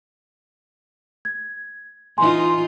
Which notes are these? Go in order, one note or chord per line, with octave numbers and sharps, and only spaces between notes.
G#6
E3 D#4 F4 G#5 C6